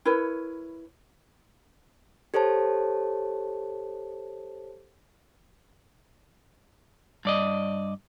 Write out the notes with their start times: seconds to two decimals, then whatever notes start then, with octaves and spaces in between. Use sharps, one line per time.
0.05 E4 A#4 B4 C#5
2.34 G4 A4 C5 C#5 A5
7.25 G2 D5 D#5